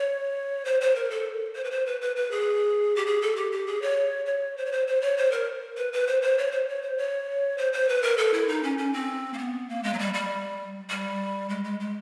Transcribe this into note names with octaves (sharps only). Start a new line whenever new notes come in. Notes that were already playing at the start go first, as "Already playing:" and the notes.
Already playing: C#5
C5
C5
A#4
A4
C5
B4
C5
B4
B4
B4
G#4
G4
G#4
A4
G4
G4
G#4
C#5
C#5
C5
C#5
C5
C5
C#5
C5
A#4
B4
B4
C5
C5
C#5
C5
C#5
C5
C#5
C5
C5
B4
A#4
A4
E4
D#4
C#4
C#4
C4
A#3
B3
A#3
G#3
F#3
G3
G3
G3
G#3
G#3
G#3